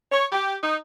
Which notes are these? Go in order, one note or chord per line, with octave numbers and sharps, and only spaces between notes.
C#5
G4
D#4